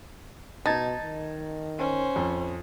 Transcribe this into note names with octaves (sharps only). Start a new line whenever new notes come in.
B2 D#4 A5 G#6 A6
D#3
C#4 C5
F2